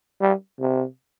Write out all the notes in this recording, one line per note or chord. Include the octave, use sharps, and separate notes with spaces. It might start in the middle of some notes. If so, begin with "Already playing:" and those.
G3
C3